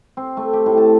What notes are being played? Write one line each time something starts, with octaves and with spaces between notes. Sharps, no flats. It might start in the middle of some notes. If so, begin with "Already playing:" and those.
C4
A3
G4
A2
A5